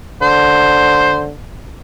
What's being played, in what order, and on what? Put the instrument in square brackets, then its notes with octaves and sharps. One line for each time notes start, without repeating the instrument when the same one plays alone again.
[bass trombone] D3 [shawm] C5